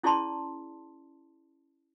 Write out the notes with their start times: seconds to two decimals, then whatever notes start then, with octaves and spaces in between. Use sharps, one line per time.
0.03 C#4 E4 G#4 D5 A5 C6